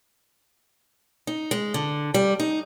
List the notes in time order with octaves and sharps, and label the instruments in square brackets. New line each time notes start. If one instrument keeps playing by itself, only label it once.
[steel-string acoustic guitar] D#4
G#3
D3
G3
D#4